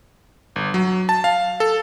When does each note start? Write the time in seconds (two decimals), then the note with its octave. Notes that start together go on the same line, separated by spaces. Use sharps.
0.56 G1
0.74 F#3
1.09 A5
1.24 F5
1.60 A4